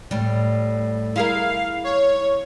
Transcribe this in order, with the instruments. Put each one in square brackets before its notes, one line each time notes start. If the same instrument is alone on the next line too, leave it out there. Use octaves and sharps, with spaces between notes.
[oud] A2 G3
[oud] E4 G#4 A#4 [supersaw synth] F5
[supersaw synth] C#5